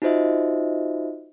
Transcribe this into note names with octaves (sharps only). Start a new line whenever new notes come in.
D#4 F4 F#4 C5 D#5 E5